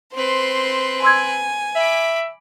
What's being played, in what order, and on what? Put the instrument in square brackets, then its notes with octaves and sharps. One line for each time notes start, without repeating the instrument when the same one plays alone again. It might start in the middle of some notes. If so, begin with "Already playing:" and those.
[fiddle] C4 B4 [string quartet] C5 C6
[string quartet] G#5 [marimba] C6 E6 G#6
[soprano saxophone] E5 [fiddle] B5 D6